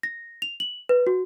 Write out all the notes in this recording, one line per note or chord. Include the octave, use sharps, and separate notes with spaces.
A#6
F7
F#7
B4
F#4